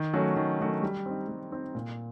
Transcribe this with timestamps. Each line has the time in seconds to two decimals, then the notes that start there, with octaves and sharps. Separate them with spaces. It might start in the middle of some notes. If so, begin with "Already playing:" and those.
Already playing: D#3
0.14 F#3 A3 C#4 F#4
0.36 D#3
0.60 F#3 A3 C#4 F#4
0.82 G3
1.06 C4 D#4
1.28 G3
1.51 C4 D#4
1.75 A#2